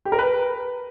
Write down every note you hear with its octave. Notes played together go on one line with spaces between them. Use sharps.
G4
A#4
B4